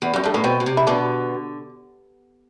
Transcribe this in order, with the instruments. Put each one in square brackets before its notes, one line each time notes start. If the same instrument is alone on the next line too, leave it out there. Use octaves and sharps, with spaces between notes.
[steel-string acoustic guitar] E2
[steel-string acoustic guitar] F#2 [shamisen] G3
[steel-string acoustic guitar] G2 [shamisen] A3
[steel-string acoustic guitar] A2 [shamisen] B3
[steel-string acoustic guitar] B2 [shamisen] C4
[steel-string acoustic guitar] B2
C3
[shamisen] E4
[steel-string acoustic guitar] B2 D3 [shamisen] D4